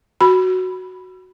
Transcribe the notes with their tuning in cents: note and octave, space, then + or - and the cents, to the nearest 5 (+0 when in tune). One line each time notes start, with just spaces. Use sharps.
F#4 +0 B5 +0